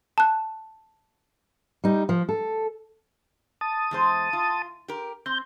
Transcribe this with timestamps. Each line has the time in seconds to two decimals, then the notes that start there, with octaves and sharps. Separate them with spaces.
0.18 A5 F#6
1.84 G3 D#4
2.09 F3
2.29 A4
3.61 A5 D#6
3.91 E2 G#3 C5
4.33 F4
4.88 G4 A#4
5.26 C4 G6